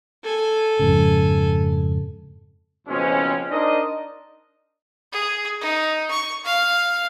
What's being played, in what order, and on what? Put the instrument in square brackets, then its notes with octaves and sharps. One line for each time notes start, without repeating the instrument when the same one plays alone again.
[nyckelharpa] A4 G#5
[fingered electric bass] F2 G#2 C#3
[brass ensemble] F#1 F2 B2 G#3 C4 C#4
D4 D#4 A#4 C5 D5 D#5
[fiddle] G#4
D#4
C#6
F5